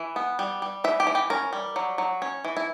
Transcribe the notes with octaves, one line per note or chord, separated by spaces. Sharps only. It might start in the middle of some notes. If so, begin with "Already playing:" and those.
Already playing: E3
B3
G3
G3
E3 E5
G4
E3
G4
C#4 A#4
G3
F#3
F#3
C#4
E3
E4